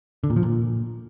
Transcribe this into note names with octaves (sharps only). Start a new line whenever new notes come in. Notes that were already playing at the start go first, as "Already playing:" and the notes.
D3
A#2
F3
A#2